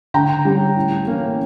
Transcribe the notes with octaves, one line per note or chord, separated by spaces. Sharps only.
D3 G5 A#5
G3 C#4
A2
E3 A#3 C#4